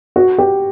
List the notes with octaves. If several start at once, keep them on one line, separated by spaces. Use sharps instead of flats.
F#4
G4